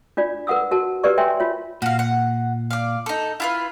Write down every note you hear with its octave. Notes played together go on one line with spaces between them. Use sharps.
D4 F4 D5
A#4 B4 F#5 D#6 E6
F#4 A#4 A5
G4 A#4 B4 D5 C#6
A#4 C#5 E5 G5 G#5 C6
F4 C#5
A#2 F#4 F5
F#5
D5 F5
D#4 A4
E4 F4 B4